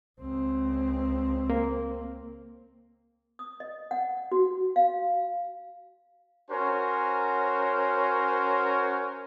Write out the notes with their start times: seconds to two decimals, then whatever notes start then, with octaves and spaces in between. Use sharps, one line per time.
0.20 C#2 C4
1.50 A#3
3.39 D#6
3.60 D#5
3.91 F#5
4.32 F#4
4.76 F5
6.51 C#4 F#4 A#4 C5 C#5